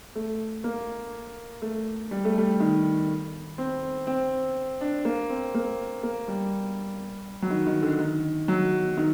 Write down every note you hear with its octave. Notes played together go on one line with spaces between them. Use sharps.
A3
A#3
A3
G3
A3
G3
D#3
C4
C4
D4
A#3
C4
A#3
A#3
G3
F#3
D#3
D#3
D3
D#3
F#3
D#3